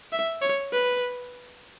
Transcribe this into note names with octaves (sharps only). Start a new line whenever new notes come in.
E5
C#5
B4